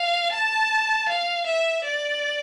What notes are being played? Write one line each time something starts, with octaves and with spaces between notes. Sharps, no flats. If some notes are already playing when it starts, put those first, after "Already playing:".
Already playing: F5
A5
F5
E5
D5